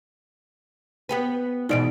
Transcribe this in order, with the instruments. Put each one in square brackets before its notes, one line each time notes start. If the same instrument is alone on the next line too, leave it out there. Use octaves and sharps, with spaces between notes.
[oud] B3 G4 B4
[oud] G#2 B2 E3 [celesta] D#4 D5 D7